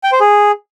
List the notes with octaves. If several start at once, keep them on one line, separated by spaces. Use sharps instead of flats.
G5
C5
G#4